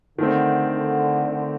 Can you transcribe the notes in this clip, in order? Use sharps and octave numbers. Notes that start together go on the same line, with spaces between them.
D3 D#3 A3 C4
D3
D3